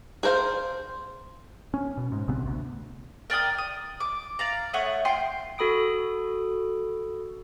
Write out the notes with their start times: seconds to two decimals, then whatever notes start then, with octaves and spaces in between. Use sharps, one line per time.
0.23 G#4 A#4 C5 F5
1.74 C#4
1.97 B2
2.12 G#2
2.28 A#1 C3 B3
2.46 D2
3.30 A#4 D5 G5 D#6
3.58 D#6
4.00 D6
4.39 D5 F5 A#5
4.73 A3 C#5 F#5 D#6
5.05 F4 G5 C6
5.58 F#4 A4 B5 D#6 D7